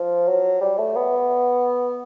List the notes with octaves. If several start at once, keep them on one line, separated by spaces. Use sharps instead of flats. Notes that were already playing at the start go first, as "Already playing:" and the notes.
Already playing: F3
F#3
G3
A3
B3